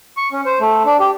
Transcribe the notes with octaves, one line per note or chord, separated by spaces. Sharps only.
C#6
C#4
C5
A3
D4
G4